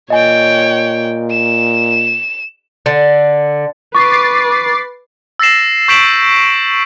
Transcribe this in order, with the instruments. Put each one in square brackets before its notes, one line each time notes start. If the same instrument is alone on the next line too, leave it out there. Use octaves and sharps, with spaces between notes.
[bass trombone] A#2 [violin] C#5 G5 [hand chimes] D#5 G#5
[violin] E7
[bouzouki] D3
[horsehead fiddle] B4 [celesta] C#6 [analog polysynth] D6 A6 C7
[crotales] E6 A6 A#6 C7 E7
C#6 G6 B6 D7 E7 F#7